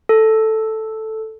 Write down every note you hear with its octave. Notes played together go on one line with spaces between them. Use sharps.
A4